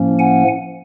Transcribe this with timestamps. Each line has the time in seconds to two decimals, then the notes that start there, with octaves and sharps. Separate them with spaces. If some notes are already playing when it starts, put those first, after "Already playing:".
Already playing: A2 F3 A#3 C#4
0.18 F#5 G#5